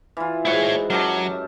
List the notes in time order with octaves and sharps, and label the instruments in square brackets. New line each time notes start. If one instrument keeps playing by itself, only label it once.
[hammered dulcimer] E3 F4
[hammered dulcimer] G#2 F#4 [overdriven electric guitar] E4 C#5
[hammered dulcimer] F#2 G4 A5 [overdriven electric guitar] F#3